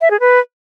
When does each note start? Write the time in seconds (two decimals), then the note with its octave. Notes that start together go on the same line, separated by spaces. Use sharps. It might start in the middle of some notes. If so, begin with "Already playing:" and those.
0.01 E5
0.10 G#4
0.20 B4